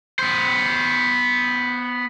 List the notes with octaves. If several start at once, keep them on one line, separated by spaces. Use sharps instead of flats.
B3 C5